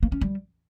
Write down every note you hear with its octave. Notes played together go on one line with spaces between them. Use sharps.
A#3
C#4
G3